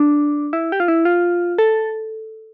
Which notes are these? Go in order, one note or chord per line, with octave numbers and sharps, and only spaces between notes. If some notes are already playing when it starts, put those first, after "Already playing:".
Already playing: D4
E4
G4
F4
E4
F4
A4